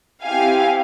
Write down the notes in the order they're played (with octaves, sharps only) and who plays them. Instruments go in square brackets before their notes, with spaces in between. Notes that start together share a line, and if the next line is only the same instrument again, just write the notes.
[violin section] C4 E4 G4 F5 G#5